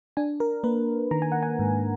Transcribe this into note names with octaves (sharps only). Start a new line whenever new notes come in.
D4 G#5
A#4
A#3 B4
D#3 A#5
G#5
F#5
G#5
G#2